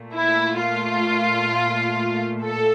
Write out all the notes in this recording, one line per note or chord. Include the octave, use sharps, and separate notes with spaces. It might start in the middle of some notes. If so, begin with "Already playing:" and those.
Already playing: A#2 A3
E4
F4
A4